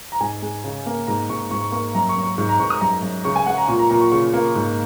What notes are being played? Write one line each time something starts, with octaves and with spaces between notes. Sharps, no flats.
A#5
G#2 G#5
G#3
C#3
A#3
G#2 A#5
G#2 C#6
G#2 C#6
C#6
A#3 C#6
F#2 A#5
C#6
F#2
C#6
G#2 C#6
A#5
G#2 C#6
D#6
F#2 A#5
F#2
C#3 C#6
G#5
G#3 F#5
A#5
A#2 C#6
A#5
A#2 A#5
C#6
C#3 C#6
A#3
G#2